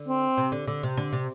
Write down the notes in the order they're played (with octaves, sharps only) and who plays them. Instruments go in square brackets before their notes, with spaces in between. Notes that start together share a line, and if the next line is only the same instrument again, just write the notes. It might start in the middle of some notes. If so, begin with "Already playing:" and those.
Already playing: [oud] D3
[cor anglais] C4
[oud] C3
D3
D3
C3
D3
C3